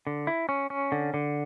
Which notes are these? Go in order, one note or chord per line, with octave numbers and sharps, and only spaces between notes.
D3
E4
C#4
C#4
D3
D3